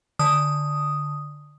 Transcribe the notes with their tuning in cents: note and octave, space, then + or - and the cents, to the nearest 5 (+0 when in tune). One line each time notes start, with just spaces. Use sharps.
D3 +0 D#6 +0